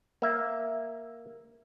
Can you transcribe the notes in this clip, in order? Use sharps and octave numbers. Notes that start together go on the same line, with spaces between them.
A#3 E5